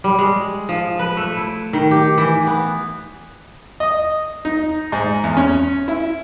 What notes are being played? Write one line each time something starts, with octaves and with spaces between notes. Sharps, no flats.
G3
G#3
F3
B4
A3
E4
D#3
G4
E3
B3
D#5
D#4
G#2
E2
C#4
E4